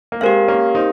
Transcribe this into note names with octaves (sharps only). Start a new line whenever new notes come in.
A#3
G#3 C4 G4 A#4 F5
A#3 C#4
C4 D#4